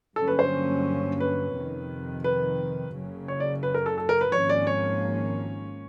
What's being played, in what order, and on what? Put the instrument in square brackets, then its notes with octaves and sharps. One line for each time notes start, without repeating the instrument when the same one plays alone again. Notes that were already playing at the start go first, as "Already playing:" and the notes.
[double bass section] G2 D3 F#3 A#3 C#4 [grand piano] A4
[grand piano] B4
C5
B4
[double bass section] F2 C3 D#3
[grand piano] B4
[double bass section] F#1 F#2 C#3
[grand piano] C#5
D5
B4
A#4
A4
A4
A#4
B4
[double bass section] G#1 G#2 F3 A#3 C#4 [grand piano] C#5
[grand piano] D5
C#5